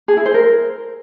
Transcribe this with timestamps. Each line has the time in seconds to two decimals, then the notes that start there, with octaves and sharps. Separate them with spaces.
0.08 G#4
0.17 E4
0.26 C5
0.34 A#4